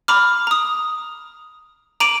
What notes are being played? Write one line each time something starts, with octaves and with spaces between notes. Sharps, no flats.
A#5 B5 D6 F6
A#5 D#6
A#5 D6 D7 D#7 F#7